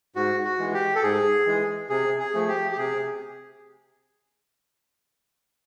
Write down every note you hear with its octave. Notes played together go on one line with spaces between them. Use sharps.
G#2 F#4
F#4
E3 G#3
G4
A4
G#2 G#4
E3 G#3
C3 G#4
G#4
F3 A3
G4
G4
C3 G#4